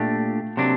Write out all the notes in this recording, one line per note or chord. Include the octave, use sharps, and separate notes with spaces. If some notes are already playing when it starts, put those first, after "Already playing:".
Already playing: A#2 A3 D4 G4
C3 F#3 A#3 D4